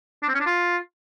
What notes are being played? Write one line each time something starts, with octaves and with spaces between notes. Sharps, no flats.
D4
C4
C#4
D4
F4